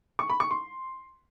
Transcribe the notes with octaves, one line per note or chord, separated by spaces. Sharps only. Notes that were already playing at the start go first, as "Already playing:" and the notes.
C#6
B5
C#6
C6